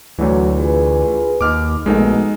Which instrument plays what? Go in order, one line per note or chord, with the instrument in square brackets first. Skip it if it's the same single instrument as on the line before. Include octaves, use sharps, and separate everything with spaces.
[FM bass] D2 [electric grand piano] E3 A3 [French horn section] F#3
[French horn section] F4 G#4 B4
[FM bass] D#2 [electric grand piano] D6 F6
[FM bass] A#1 [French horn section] B2 A3 [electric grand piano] G#3 D#4 A4